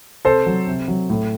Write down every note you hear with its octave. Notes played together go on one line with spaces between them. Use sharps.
C3 A4 C5
F#3
C3
F#3
A2